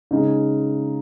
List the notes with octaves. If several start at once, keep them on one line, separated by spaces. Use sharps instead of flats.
C#3 G#3 D#4